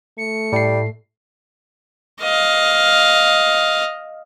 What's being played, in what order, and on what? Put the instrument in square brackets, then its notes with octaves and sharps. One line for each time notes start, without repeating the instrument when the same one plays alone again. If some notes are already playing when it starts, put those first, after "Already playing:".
[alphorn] A3 [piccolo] C#7
[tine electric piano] A2 C7 [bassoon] G3
[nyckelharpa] D#5 F5